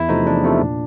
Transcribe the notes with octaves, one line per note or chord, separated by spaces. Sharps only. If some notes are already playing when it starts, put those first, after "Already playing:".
Already playing: E2 E4
C3 F3 A3 D#4
E2 D4
C3 F3 A3
A#2